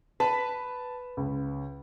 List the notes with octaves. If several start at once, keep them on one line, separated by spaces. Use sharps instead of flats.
B4 A5
C#2